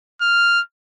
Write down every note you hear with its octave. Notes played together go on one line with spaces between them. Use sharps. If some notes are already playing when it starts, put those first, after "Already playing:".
F6